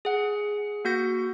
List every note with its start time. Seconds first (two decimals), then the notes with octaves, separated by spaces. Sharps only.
0.05 G#4 F#5
0.85 A#3 F#4 F#5 G6 A#6 C#7